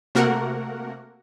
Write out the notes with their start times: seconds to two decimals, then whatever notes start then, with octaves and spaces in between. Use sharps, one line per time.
0.15 C3 A3 A#3 F#4 A#4 F#5